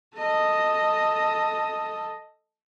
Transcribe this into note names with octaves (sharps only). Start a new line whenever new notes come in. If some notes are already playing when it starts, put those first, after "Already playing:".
A4 D#5